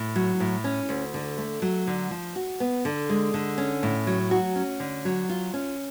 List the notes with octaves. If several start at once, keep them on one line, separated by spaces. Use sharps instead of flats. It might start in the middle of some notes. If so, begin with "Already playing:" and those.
Already playing: A2
F#3
A2
C#4
D2
D3
A3
F#3
D3
F3
F#4
B3
D3
G#3
D3
C#4
A2
F#3
F#4
C#4
D3
F#3
F4
C#4